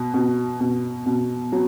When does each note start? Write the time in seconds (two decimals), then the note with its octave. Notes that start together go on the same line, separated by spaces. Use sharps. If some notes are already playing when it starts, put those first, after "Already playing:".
Already playing: B2
0.14 B2
0.60 B2
1.06 B2
1.52 F#3